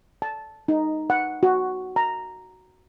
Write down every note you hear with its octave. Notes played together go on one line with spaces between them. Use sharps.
A5
D#4
F#5
F#4
A#5